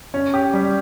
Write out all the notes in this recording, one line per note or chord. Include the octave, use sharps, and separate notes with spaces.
C#4
G4
G3